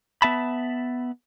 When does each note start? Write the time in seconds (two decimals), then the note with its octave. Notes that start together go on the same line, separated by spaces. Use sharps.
0.22 B3 E5 A5 B5